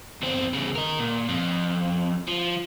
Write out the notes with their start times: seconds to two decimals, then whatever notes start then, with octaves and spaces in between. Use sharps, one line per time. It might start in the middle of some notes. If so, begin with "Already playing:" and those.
0.22 E2 C4
0.53 E2 C#3
0.75 A#4 D#5
0.99 A#2
1.29 F2
2.28 F3